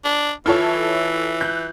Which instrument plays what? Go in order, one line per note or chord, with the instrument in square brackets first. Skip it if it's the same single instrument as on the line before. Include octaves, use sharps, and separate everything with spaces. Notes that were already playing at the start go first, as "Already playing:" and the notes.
[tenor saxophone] D4
[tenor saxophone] E3 [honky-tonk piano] E4 A4 C#5 [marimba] F4
[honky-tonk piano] F#6 G6